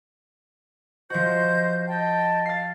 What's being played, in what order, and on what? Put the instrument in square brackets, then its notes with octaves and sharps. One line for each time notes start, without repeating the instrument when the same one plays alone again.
[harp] F3 F#4 [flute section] C5 D#5 G6
[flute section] D#5 G5 A5
[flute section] F5 [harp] A6 C7